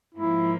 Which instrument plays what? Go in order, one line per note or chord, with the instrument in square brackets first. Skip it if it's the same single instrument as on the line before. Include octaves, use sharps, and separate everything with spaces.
[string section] G#2 F3 A#3 [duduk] E4